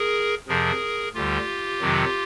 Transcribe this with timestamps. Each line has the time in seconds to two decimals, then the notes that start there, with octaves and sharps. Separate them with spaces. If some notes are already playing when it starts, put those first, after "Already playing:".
Already playing: G#4 A#4
0.48 F2 C3 F3 G#4 A#4
1.14 D2 D3 G3 F4 G4
1.81 F2 C3 D#3 F#3